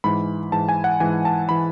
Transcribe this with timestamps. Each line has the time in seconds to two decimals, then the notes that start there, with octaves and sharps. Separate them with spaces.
0.04 G#2 E3 B5
0.52 G#2 E3 A5
0.69 G#5
0.84 F#5
1.00 G#2 E3 G#5
1.25 A5
1.49 E3 B5